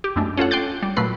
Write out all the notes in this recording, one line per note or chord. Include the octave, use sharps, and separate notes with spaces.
G4
F#2 G#3 A3 D4
C#4 F4 A4 F#5
G5 C6 D6 F#6 G6 A6
G3
A#2 F#3 A3 B4 C7